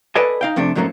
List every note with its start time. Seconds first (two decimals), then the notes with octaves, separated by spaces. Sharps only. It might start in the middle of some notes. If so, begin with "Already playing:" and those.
0.15 A4 B4 D5 D#5 G#5
0.41 D#4 F5 G5
0.56 F2 C3 A3 D4
0.75 F2 G#2 F#3 A3 A#3 C#4